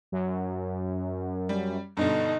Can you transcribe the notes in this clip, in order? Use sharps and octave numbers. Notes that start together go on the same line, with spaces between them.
F#2
G3
G2 B2 D3 D#4